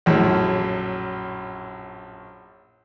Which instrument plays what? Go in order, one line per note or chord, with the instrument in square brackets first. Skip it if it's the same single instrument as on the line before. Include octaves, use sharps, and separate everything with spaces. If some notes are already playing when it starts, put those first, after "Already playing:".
[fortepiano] A#1 F#2 A2